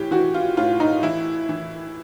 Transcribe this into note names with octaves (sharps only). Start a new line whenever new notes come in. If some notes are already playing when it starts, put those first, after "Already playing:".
Already playing: A2 E3 G4
E3 F#4
F4
A2 F4
D#4
E3 E4
E3